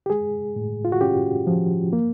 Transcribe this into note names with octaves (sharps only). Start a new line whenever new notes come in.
G4
G#3 G#4
A2
F4
F#4
C#4 G4
F3
A#3